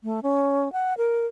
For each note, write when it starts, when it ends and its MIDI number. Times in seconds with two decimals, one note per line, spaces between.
0.04 0.20 57
0.23 0.71 61
0.73 0.94 78
0.98 1.26 70